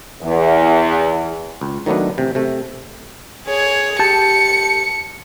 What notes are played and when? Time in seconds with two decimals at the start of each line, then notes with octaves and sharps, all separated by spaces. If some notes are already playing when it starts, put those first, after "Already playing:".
0.22 E2
1.61 C#2
1.86 D#3 F#3 A3 B3 D4
2.18 A1 C3
2.35 C3 A3
3.47 G#4 C#5
3.99 G4 A5 C#7